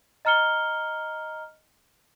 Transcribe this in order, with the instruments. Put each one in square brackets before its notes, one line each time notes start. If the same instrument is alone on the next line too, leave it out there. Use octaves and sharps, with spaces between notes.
[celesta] D#5 A#5 F6 C#7 G7